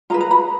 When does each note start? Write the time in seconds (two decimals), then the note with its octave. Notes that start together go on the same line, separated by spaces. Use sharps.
0.10 F4 G#4 B4 A#5
0.21 A#5
0.31 B5